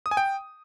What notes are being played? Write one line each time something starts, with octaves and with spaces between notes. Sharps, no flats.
D#6
G#5
G5